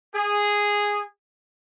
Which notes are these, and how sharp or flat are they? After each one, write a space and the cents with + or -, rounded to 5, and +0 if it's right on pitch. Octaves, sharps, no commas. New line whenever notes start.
G#4 -10